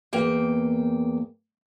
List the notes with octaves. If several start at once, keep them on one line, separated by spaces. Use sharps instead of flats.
E2 A#3 G5